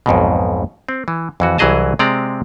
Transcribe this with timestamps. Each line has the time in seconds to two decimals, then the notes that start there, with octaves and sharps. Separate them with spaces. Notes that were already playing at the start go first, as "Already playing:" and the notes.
0.06 B1 F2 G#2 B2
0.89 C4
1.08 E3
1.40 F2 E3 F#4
1.58 C2 E3 F#3 G#4 D#5 A5
1.99 C3 G#3 C4 D5 A#5